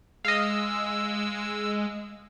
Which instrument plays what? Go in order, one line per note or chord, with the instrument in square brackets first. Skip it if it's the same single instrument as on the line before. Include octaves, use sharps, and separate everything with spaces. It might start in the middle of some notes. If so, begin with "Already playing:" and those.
[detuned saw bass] G#3 [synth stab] D#5 F5 [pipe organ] E6